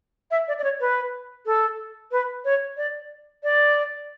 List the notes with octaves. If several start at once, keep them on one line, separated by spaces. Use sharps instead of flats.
E5
D5
D5
C#5
B4
A4
B4
C#5
D5
D5